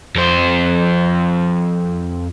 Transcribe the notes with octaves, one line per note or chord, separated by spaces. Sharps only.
F2 C5